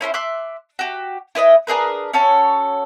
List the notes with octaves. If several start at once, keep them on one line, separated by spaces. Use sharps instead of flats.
C#4 E4 A#4 C5
E5 C6 D6 F#6
F#4 G4
E4 B4 D5 D#5
D4 G#4 A#4 B4
C#4 F#4 A4 C#5